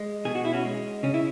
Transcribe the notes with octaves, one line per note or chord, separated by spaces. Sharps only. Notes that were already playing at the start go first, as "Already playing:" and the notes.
Already playing: G#3
B2 G#4
F#4
E4
C#4 F#4
G#3
C#3 C#4
E4